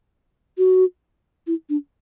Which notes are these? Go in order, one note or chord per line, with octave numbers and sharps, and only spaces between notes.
F#4
E4
D4